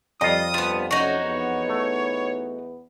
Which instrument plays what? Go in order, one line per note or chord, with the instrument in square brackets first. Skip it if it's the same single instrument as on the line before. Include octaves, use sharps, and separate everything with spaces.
[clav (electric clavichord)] F2 F4 [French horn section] G3 [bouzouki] D#5 [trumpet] D#6
[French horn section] G2 [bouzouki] F3 B3
[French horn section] F#3 A3 C#4 [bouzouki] D#4 F#4 [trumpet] C#5
[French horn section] E2 B3
[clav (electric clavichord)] A3